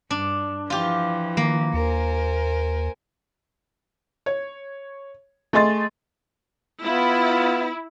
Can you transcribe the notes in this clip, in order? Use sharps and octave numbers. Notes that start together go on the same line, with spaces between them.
G2 D4
E3 F3 F4 G4
D#3 A#3
D#2 A#4 C5 G#5
C#5
A3 G#4 D#5 C6 A6
B3 E4 F4